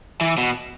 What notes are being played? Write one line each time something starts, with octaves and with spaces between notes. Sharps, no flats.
E3
B2